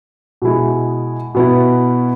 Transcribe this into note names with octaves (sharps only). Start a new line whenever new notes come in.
B2 G#3 E4
B2 B3 E4